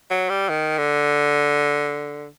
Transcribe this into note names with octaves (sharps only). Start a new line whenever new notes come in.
F#3
G3
D#3
D3